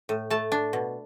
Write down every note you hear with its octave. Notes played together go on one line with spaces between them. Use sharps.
A2
A3 A5
D4
B2